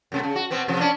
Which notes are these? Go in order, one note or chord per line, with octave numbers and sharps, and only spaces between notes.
F#2 C3 A3
C#3
F#4
B2 B3 C4
C3 F3
C#4 D4